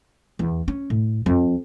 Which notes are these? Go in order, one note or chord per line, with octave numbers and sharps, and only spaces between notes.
E2
C#4
A2
F2